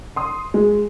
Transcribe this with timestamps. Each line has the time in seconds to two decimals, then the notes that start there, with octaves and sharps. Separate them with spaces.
0.16 C6 D#6
0.54 G#3